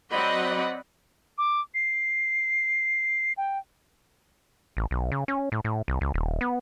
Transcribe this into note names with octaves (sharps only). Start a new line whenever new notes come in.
F#3 C4 D5 D#5 F#5 B5
D6
C7
G5
A1
B1
C#3
C#4
A2
A2
C2
C#2
D#1
B3